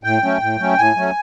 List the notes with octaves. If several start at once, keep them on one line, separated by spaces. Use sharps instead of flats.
A2 G5
F#3 A3 C#4
A2
F#3 A3 C#4
A2 G#5
F#3 A3 C#4